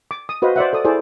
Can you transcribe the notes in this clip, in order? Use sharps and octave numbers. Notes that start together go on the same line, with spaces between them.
D6
D#6
F#4 B4 C5 D#5 F5
C5 D5 E5 F#5
A4 D5 D#6
E4 G#4 A4 C5 D5